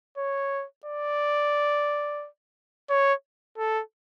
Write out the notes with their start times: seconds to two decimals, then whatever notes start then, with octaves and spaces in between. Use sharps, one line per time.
0.18 C#5
0.86 D5
2.90 C#5
3.58 A4